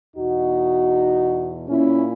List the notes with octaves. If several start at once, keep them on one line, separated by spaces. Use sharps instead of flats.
E2 B2 D#4 F#4
A#2 C#4 E4